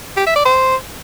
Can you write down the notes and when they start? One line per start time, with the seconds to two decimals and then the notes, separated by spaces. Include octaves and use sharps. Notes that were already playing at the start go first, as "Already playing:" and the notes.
0.17 G4
0.26 E5
0.36 D5
0.45 C5